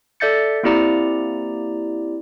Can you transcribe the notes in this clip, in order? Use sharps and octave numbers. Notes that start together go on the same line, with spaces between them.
A4 D5 E5 G6 A6 C#7
A#3 C4 E4 G4 D5 A#5